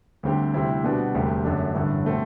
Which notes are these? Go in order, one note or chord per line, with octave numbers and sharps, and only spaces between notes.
D2 D3 G3 C4 G4
D2 C3 G3 C4 E4
B2 G3 B3 D4 F#4
E1 D2 C3 G3
F#2 D3 A3 D4
A1 G2 D3 A3
B2 A3 C4